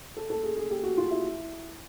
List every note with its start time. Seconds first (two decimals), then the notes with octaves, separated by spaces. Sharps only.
0.17 A4
0.30 A4
0.43 G#4
0.57 G#4
0.71 G4
0.83 F#4
0.97 F4
1.11 E4